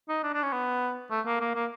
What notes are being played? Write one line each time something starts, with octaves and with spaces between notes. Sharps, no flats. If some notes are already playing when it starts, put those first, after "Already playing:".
D#4
D4
D4
C#4
B3
A3
A#3
A#3
A#3